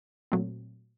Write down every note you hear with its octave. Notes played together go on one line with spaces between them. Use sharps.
A#2 F#3 A3 C4